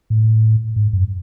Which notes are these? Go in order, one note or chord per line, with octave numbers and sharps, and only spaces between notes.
A2
G#2
F#2